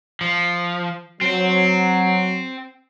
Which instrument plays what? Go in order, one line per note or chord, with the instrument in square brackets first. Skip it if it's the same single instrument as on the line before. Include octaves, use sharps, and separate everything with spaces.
[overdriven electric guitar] F3
[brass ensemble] F#3 [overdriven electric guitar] C4